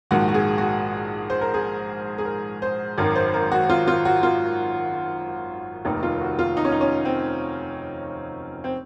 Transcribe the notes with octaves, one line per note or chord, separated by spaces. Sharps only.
A#1 G#2 D#3 F#4
F#4
G#4
F#4
C5
A#4
G#4
G#4
A#4
C5
G#1 F#2 D#3 A#4
C5
A#4
F#4
F4
F4
F#4
F4
F1 D#2 D#3 D#4
F4
F#4
F4
D#4
C#4
D#4
C#4
C4
C4